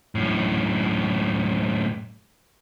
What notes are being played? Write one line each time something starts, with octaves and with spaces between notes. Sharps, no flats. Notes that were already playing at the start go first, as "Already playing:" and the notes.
F#2 A2